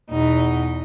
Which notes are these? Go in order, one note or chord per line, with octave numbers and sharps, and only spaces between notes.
E2 B2 D#4